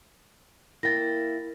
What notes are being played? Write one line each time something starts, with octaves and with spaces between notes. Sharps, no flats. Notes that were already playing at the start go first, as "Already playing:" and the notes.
A#3 E4 G5 A6 A#6